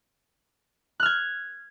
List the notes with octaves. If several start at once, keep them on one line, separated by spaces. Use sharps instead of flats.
F6 F#6 G#6